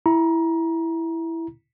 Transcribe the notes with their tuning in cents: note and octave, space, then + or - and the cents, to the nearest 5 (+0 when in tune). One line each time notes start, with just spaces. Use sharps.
E4 +0 A#5 +25